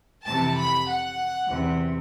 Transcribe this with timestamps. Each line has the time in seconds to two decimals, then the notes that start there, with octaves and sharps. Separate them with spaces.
0.24 F2 C3 E3 A5
0.56 B5
0.87 F#5
1.49 E2 C3 E3